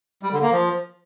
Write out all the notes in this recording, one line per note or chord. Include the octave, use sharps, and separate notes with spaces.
G3
D3
A#3
F3